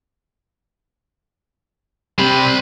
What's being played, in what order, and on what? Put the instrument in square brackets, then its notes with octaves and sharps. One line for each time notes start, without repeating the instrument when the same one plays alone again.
[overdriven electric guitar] C3 [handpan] G3 [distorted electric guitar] C5 B5